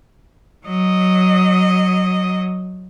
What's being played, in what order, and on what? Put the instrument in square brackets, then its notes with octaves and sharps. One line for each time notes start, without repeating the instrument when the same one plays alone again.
[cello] F#3 D#5